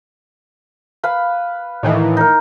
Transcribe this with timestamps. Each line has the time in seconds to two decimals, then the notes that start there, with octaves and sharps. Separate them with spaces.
1.03 B4 F5 B5
1.83 A2 D#3 E3
2.17 D#4 A#4